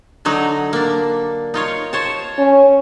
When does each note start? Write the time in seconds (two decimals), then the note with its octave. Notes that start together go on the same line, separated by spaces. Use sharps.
0.25 D3 F#3 D#4
0.73 A#3 D4
1.54 D#4 F4 C#5
1.93 C5 C#5 A5
2.38 C#4